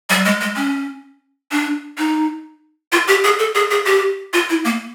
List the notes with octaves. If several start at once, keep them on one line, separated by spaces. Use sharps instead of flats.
G3
G#3
G#3
C#4
D4
D#4
F4
G4
G#4
A4
G#4
G#4
G4
F4
E4
A#3